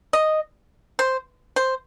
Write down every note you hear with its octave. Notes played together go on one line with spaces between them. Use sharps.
D#5
C5
C5